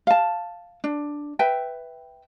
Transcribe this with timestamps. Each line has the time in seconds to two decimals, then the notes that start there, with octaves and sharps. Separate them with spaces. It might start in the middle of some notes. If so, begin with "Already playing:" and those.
0.07 F5 A5
0.84 D4
1.39 B4 E5 G5